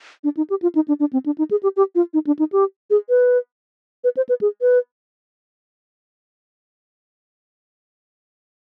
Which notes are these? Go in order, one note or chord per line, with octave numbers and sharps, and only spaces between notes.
D4
D#4
G4
F4
D#4
D4
D4
C4
D4
D#4
G#4
G4
G4
F4
D#4
D4
D#4
G4
G#4
B4
B4
C5
B4
G#4
B4